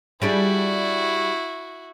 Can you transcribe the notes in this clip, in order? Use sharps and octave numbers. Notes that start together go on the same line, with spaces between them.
G3 D4 E4 F#4 G#4